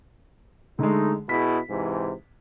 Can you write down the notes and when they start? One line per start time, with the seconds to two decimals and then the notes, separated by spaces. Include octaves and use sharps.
0.79 D3 G#3 A3 D#4
1.29 B2 E4 G#4 B6
1.70 G#2 C3 E3